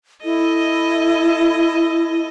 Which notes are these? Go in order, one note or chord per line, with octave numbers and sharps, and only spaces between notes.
E4 A4 D#5